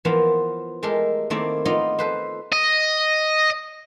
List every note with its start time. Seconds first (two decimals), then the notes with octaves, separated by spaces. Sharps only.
0.05 E3 F3 A#3 B3 F4
0.83 G#3 A3 G4 A4 A#4
1.30 D#3 A3 A#3 C4 E4 D5
1.65 B3 D#4 F4 D5 D#5 F5
1.99 A4 B4 C5
2.53 D#5